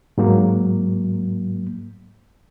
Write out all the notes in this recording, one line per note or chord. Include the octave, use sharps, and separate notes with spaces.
G#2 F#3 A#3